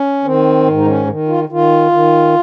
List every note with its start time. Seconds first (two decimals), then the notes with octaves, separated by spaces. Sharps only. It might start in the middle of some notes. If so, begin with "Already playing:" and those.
Already playing: C#4
0.24 D#3 C4
0.67 G#2
0.77 D#4
0.86 C#4
1.08 D#3
1.28 F4
1.49 D#3 F4
1.92 D#3